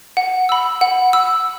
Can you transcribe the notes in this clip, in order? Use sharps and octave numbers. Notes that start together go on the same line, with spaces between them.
F#5
B5 E6
F#5
B5 E6